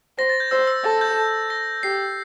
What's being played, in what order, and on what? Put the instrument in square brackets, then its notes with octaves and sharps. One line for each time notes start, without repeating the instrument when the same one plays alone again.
[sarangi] C5 [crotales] A#6
[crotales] A6
G6
[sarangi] C5 [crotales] E6
[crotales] E6
[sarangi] A4 [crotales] A6
[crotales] G6
A#6
[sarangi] G4 [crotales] C7